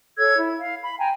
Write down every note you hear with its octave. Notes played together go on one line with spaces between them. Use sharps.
A4 C#5 E6 G#6
E4
F5
B5
G5 G#5 A#5